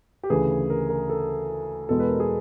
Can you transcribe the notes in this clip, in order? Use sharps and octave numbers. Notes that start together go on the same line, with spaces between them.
G4
D2 C#3 E3 G#4
A#4
A#4
A4
E2 B2 G#3 A4
B4
A#4
G#4